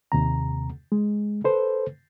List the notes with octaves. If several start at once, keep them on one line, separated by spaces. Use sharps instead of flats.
D#2 C3 A#5
G#3
A4 B4 C5